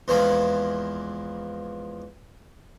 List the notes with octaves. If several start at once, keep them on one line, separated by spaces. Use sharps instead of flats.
E2 E3 F3 G#3 A#3